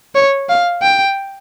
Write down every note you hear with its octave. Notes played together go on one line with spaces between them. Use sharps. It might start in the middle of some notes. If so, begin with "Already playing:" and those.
C#5
F5
G5